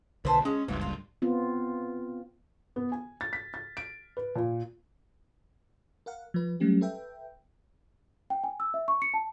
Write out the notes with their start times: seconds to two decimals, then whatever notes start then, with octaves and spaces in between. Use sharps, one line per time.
0.25 B1 D3 B4 C5 A5
0.45 G#3 C#4
0.68 F#1 C#2 G2 E3 F4
0.81 F4
1.22 B3 C4 F4
2.76 B3
2.92 G#5
3.21 A6
3.33 B6
3.54 A6
3.77 D7
4.17 B4
4.36 A#2
6.06 A#4 F5 F#5
6.34 F3 B4
6.60 F#3 G3 A3 C#4 G4
6.81 A4 B4 E5 G5
8.30 G5
8.44 G#5
8.60 E6
8.74 E5
8.88 C#6
9.02 C#7
9.14 A5